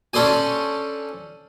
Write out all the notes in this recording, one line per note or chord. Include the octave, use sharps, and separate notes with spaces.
C#4 D4 A4 C5 D5 G#5